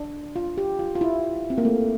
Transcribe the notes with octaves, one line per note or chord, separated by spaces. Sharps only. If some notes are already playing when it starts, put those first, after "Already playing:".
Already playing: D4
F4
G4
F4
F4
E4
C4
A#3
A3